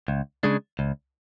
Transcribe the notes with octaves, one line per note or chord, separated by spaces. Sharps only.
C#2
C#3 G#3 D4
C#2